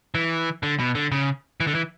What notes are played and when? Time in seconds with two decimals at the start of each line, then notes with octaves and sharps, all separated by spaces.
0.15 E3
0.63 D3
0.79 B2
0.95 D3
1.12 C#3
1.60 E3
1.67 D3
1.75 E3